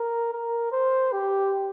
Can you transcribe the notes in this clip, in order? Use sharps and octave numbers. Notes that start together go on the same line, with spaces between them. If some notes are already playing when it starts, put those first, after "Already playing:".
Already playing: A#4
A#4
C5
G4